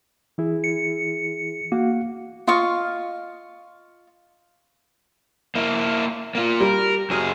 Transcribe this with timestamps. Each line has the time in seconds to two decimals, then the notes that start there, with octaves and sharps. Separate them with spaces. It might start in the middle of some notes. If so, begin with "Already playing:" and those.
0.38 E3 E4 G#4
0.64 C#7
1.72 A#3 F#4 F5 F#5
2.47 F4 D#5 F5 C#6
5.55 A#3 E4
6.35 A#3 F4
6.60 G3 A#4
7.10 F#2 F#3 G#4 F6 D#7